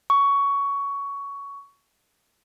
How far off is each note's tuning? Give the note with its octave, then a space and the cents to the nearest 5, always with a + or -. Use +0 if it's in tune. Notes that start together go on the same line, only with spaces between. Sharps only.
C#6 +15